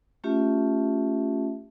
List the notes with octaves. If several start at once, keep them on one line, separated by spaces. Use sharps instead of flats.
A3 C#4 F4 G4 E5 A5